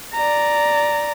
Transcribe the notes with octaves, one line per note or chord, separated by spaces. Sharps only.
D5 A#5